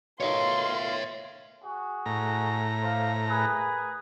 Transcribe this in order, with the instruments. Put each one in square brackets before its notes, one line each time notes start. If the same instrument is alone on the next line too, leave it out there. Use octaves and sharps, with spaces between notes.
[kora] B2 D#3 A3 [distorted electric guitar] C#5 E5 [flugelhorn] F5 [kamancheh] C6
[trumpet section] F#4 G#4
[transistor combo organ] A2 A#5
[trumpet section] D4 C5 F5
G#4 A#4 B4